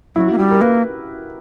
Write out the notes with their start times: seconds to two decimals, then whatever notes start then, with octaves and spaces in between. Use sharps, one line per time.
0.15 F#3 E4
0.27 A#3 F#4
0.38 G3 G4
0.51 A#4
0.61 A#3 B4